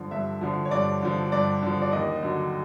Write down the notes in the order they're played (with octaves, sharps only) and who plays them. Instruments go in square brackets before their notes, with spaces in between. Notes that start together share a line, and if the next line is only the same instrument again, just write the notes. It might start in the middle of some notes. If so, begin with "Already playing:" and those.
Already playing: [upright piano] G2 D3 F3
G2 E5
D3 F3
C#5
G2 D5
D3 F3
G2 D5
D3 F3
D5
D#2 D#5
D3 F#3